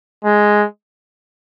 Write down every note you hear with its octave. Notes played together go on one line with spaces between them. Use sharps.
G#3